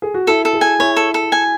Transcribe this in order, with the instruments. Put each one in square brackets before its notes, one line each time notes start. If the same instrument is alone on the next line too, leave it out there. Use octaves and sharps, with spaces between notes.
[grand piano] G#4
F#4
[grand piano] E4 [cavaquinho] A4
[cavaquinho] A4
[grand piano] G#4
[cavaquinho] G#5
[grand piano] E4 [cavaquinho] C#5
[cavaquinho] A4
A4
G#5